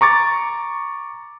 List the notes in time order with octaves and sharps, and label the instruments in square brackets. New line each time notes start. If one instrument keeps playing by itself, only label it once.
[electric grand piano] A#5 C#6 D6 A6